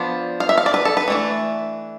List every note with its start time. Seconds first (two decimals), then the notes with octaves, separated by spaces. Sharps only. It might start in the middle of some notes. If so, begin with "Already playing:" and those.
Already playing: F3 B3 D4
0.40 F5
0.49 E5
0.58 F5
0.66 D5
0.74 B4
0.85 A4
0.97 B4
1.08 E3 A3 D4